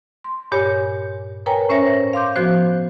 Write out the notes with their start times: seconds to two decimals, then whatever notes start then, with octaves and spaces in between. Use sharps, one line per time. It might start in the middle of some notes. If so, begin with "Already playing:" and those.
0.24 C6
0.52 G2 A#2 G4 C#5 G#5
1.46 A#4 B4 C#5 G5 G#5 A#5
1.69 A2 C#4 C5 C#5 E5 A#6
2.13 F5 C6 D6 G6
2.36 F3 B3 F#4 C5